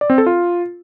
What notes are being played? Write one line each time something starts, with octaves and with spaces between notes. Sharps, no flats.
D5
C4
A4
F4